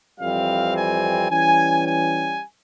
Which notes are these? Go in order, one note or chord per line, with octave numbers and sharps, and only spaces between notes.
F2 E3 G3 C4 F5
G#5
E3 G3 C#4 G#5
G#5